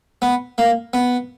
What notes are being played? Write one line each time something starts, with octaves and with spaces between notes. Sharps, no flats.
B3
A#3
B3